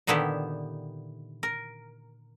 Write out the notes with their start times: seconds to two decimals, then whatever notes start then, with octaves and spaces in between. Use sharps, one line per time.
0.07 A#2 D3 D#3 B3 E4 G4
1.43 A#4